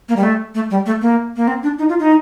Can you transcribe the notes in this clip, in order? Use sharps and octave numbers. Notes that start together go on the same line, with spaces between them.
A#3
G3
A3
A3
G3
A3
A#3
A#3
C4
D4
D#4
F4
D#4